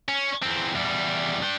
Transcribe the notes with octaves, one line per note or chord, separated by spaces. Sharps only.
C#4
E2 C4
E2 G3
D4 G5